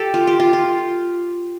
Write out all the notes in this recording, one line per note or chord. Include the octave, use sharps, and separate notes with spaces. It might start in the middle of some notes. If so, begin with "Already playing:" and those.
Already playing: G4 A4
F4
G4
F4
F4